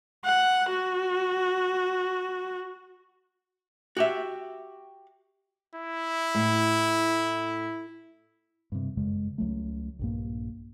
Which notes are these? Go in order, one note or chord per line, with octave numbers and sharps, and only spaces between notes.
F#5
F#4
F#4 G4 E5
E4
A2
G2 C3
G1 F#2 C#3 G#3
C#2 F#3 A3
A#1 G2 A#3